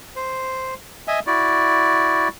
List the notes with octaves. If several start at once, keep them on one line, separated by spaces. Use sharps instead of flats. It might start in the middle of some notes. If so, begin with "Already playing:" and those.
C5
D#5 E5 G#5
E4 F#4 D5